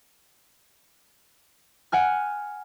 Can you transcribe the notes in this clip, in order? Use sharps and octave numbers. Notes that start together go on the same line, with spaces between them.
F#5 G#5 F6